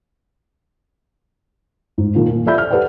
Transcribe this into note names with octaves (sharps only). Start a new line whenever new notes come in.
G#2
A#2 D#3 F3
A#2
F3 A4 D5 E5 B5 G6
F6
G4 A4 B4 D5 F#5